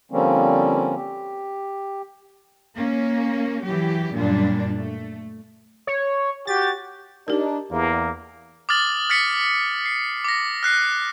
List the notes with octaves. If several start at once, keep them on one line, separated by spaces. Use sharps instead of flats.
D3 F3 G3 A#3 C4 C#4
G4
A#3 C#4
E3 F#3 G4
F#2 A#2 G3 A#3 D4
A3
C#5
F#4 G4 A6
D4 D#4 G4 A#4
E2 A#3
D6 D#6 F6 A6 F#7
F6 A6 B6 C#7
C7
D6 A#6
F6 F#6 C7